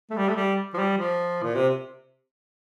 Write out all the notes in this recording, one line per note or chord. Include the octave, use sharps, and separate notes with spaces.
A3
G3
A3
G3
F3
G3
F3
A#2
C3